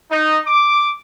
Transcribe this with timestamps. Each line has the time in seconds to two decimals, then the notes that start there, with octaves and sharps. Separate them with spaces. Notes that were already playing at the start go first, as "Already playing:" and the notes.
0.10 D#4
0.46 D6